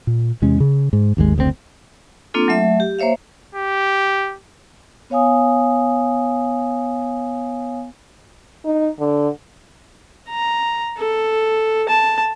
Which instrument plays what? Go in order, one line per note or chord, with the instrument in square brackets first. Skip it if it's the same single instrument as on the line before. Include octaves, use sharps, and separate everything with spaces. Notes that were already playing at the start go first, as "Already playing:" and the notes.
[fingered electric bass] A#2
E2 C3 G#3 C#4
C#3
G#2
G#1 D#2 D3 G#3
F#1 D2 B2 C4
[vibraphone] A#3 C4 D4 F4 A4
F#3 A3 E5
G4
A#3 C5 C#5 E5 F5
[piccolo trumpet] G4
[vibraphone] B3 C#5 F5 G#5 D#6
[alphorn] D#4
D3
[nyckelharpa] A#5
A4
A5